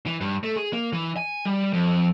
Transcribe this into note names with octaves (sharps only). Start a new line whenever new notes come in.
E3
G2
A3
G#4
A#3
E3
G#5
G3
F2